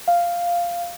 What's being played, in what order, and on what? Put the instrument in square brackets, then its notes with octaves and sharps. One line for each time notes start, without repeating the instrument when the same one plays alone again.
[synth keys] F5